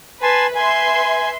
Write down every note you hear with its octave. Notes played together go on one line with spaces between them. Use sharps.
B4 G#5 A5 C6
B4 E5 G#5 C6